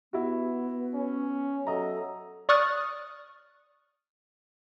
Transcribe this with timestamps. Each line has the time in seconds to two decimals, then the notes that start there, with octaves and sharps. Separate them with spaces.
0.13 B3 E4 F#4
0.94 C#4
1.67 F#3 A4 D#5 E5 A#5
2.49 D5 C#6 D#6 F6 F#6 A6